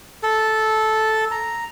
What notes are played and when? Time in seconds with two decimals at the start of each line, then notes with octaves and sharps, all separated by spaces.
0.23 A4
1.31 A#5